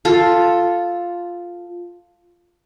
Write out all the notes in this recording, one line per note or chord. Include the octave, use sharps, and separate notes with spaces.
F4 A4